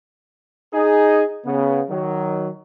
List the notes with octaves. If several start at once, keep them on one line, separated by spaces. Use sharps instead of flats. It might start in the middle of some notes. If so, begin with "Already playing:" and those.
D#4 G#4
C#3 B3
D#3 F#3